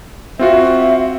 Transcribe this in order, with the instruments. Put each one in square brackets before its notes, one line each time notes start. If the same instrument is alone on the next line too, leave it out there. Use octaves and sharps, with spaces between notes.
[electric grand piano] C4 F4 F#4 [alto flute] E5